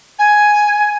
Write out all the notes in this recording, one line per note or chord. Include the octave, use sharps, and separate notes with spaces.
G#5